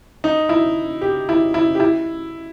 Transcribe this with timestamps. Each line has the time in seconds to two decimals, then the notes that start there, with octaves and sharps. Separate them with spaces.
0.24 D#4
0.49 E4
1.01 G4
1.29 E4
1.54 E4
1.75 G4
1.80 E4